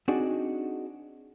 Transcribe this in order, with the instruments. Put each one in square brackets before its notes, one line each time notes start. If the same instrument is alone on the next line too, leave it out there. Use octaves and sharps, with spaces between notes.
[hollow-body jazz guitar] C4 D4 D#4 F#4 G#4 D5